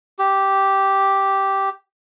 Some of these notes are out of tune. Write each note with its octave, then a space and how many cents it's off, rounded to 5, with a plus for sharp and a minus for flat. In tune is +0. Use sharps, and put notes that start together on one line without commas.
G4 -5